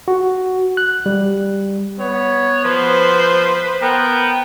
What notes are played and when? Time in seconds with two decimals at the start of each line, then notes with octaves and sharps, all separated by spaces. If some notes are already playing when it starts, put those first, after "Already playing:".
0.08 F#4
0.77 F#6
1.06 G3
2.00 B3 C#5
2.64 F3 B4 C5
3.82 B3 A#4 G5